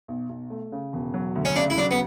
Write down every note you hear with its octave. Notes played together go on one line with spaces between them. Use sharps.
B1
B1
A3
C#3
E1
F#3
D2
C#4
C#3 D4
E4
F#3 D4
B3